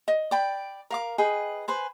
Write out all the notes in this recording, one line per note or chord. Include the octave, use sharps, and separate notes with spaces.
D#5
D5 G5 B5
A#4 F5 D6
G#4 B4 D#5 G5
B4 C5 G#5